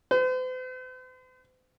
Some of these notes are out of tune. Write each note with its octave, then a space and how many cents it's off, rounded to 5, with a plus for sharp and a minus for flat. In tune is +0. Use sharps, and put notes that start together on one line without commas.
C5 -45